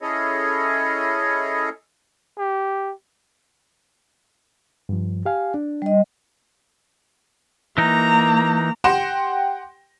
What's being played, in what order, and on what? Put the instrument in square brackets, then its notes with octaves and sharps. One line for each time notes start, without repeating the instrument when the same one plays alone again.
[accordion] C#4 E4 G#4 A4 C#5 D#5
[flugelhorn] G4
[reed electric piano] G2 F3
G4 F5 G#5
D4
[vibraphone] G3 D#5
[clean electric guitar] E3 D#4 [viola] A#3 A#5
[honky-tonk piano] G4 F#5 G5 C6 A#6 E7